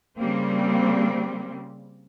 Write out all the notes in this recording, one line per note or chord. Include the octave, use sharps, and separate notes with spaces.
C#3 G3 A#3 C4